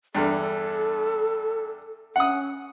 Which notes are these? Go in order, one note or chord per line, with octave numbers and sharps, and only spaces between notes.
E2 G2 A4
C#4 F#5 D#6